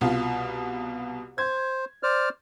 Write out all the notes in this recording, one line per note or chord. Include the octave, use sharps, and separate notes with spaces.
C2 B2 F4
C5 G#6
C5 D5 F6